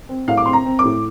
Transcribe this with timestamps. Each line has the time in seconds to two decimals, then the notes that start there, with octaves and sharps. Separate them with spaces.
0.09 C4
0.28 A2 F5
0.37 D6
0.46 C4 C6
0.53 A#5
0.66 C4
0.79 D6
0.85 A2